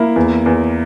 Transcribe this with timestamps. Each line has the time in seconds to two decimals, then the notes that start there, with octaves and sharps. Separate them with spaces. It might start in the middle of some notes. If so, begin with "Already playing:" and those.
Already playing: A#3 E4
0.16 E2
0.46 E2